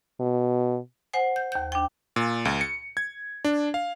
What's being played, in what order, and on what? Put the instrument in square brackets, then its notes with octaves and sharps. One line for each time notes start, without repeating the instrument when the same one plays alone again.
[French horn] B2
[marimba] C5 F#5 G#5
G6
D#2 G6
D4 G5
[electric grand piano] A#2
C#2
C#7
G#6
D4
F5